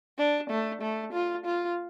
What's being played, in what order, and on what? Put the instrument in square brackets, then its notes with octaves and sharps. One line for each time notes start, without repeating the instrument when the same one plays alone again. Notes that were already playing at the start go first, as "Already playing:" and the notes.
[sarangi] D4
A3
A3
F4
F4